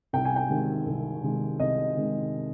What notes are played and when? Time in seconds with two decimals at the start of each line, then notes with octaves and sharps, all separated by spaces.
0.13 C2 G5
0.25 G#5
0.36 G5
0.50 C3 D#3 G#3
0.86 C2
1.23 C3 D#3 G#3
1.60 C2 D#5
1.97 C3 D#3 G#3